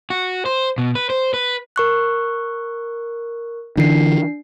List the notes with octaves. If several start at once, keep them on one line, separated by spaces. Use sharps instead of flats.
F#4
C5
B2
B4
C5
B4
A#4 C#6 F#6
D3 E3 D4 C7